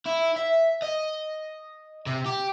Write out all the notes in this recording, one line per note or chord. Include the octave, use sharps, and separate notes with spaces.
E4
E5
D#5
C3
G4